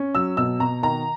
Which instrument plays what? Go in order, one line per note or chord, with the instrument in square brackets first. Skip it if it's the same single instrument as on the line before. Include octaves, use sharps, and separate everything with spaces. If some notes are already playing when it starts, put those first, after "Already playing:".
Already playing: [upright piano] C#4
F#3 E6
B2 E6
B2 A#5
D#3 A#5